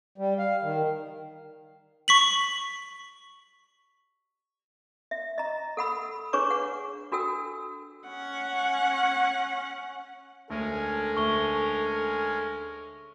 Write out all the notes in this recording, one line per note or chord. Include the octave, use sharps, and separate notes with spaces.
G3
F5
D#3
C#6 B6 F#7
E5
D#5 A#5
A4 F#5 B5 E6
D4 G#4 B4 C#5 C#6 D6
F#5
D4 F#4 A4 G5 E6
C#4 F#5
D2 G#3 C#4 A4 A#4
D2 C#6 G7